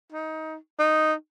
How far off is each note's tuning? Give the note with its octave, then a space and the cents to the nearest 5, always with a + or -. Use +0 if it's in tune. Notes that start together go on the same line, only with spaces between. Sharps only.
D#4 +20
D#4 -5